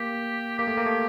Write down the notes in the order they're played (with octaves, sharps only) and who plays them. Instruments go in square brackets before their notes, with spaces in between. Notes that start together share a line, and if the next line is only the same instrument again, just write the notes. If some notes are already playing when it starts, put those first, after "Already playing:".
Already playing: [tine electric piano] A#3 [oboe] G4
[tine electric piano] A#3 [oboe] G4
[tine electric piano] A3
A#3
A3